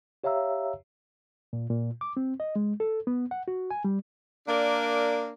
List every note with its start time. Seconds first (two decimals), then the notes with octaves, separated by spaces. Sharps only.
0.24 G4 C#5 E5 F5 A#5 E6
1.53 A#2
1.70 A#2
2.01 D6
2.17 C4
2.40 D#5
2.56 G#3
2.80 A4
3.07 B3
3.31 F#5
3.48 F#4
3.71 G#5
3.84 G3
4.48 A#3 D4 A#4 D5